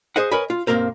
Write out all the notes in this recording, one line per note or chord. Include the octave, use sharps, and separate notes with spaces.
G#4 C5 D#5 F#5
A#4 B4 C#5 D#5 G#5 B5
F4
B1 G2 A#3 C4 A#4 C5